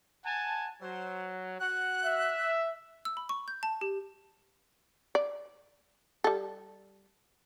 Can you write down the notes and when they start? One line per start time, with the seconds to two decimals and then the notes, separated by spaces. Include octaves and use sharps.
0.25 F#5 G#5 A5
0.81 F#3 C5
1.60 F#4 F#5 F#6
2.03 E5
3.05 E6
3.17 B5
3.29 C#6
3.48 G6
3.63 A5
3.81 G4
5.15 D5
6.24 G3 A4